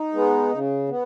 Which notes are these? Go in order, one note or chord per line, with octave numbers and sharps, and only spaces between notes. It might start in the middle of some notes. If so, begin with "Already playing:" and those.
Already playing: D#4
G#3 B3
C#3
B3